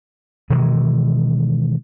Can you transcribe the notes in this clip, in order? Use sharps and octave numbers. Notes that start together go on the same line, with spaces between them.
B2 D#3 E3 G#3